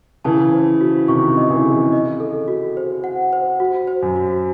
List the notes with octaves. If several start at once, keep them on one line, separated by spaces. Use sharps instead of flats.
C#3 E3 A5
C5
F#4
C3 D#3 C#6
D#5
C#3 E3
G#4
D#5
A4
F#4
C5
F#5
C5
F#4
C5
F#2
F#4